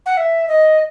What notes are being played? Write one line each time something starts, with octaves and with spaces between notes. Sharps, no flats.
F#5
E5
D#5